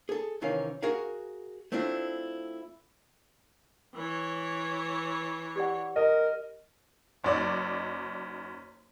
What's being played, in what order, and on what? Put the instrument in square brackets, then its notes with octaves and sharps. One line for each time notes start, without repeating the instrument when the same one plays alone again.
[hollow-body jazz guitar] G#4 A4
C2 D#3 E3 C#4 F5
F#4 G#4 A#4 F5
A3 C4 D4 E4 F4
[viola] E3 C#5
[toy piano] G4 D5 F#5
[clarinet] A#4 [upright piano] D#5
[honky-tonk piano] F#1 F#2 D#4 D5 C#6 E6